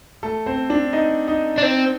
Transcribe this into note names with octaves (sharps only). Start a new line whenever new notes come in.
A3 A4
C4 C5
D4 D5
D#4 D#5
D#4 D#5
D4
C4